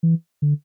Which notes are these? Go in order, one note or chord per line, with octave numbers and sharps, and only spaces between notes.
E3
D3